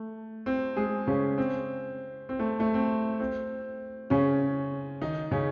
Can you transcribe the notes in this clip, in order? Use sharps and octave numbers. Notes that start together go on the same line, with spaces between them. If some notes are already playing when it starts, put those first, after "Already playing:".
Already playing: A3
C4
G#3 G#4
C#3 C#4
C4
C4
A3
A3
C4
C4
C#3 C#4
D#3 D#4
C#3 C#4